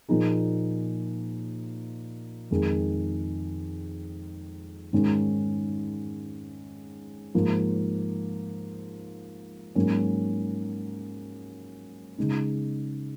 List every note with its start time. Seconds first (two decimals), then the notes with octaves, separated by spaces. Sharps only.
0.09 A#2 F3 A#3 D#4 G#4
2.51 F2 D#3 G#3 D#4 G#4
4.93 G#2 D#3 G#3 C#4
7.35 G#2 F3 A#3
9.75 G#2 F#3 A#3 C#4
12.18 C#3 G#3 D#4